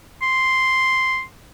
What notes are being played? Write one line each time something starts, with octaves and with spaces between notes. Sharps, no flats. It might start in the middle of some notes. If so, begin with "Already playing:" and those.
C6